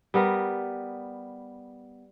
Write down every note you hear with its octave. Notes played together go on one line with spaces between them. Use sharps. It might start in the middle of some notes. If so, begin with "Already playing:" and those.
G3 B3 A#4